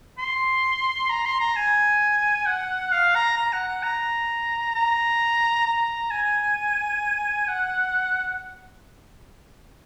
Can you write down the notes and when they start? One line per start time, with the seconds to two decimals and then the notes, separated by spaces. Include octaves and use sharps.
0.19 C6
1.10 A#5
1.26 C6
1.40 A#5
1.56 G#5
2.46 F#5
2.92 F5
3.15 A#5
3.37 A#5
3.53 F#5
3.68 F#5
3.83 A#5
4.75 A#5
5.66 A#5
6.11 G#5
7.48 F#5